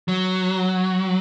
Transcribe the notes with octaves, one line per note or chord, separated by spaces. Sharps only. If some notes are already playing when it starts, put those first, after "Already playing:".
F#3